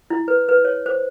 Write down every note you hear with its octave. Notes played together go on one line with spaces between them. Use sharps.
E4
B4
B4
C#5
C5